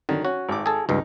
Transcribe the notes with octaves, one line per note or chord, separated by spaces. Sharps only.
D3 D#3 F#3
C#4 F#4
G#1 D6
G#4 A4
C#2 G2 D#4